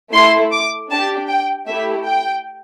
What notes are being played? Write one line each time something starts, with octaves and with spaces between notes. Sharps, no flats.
A3 E4 A4 C6
D6
D4 G4 A5
G5
A3 E4 G4 E5
G5